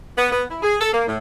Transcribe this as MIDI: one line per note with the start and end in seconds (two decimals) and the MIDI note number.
0.16 0.31 59
0.31 0.44 59
0.49 0.61 64
0.63 0.75 68
0.80 0.91 69
0.92 1.05 58
1.07 1.17 45